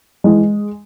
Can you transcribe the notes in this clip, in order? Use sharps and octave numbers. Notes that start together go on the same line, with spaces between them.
E3 G#3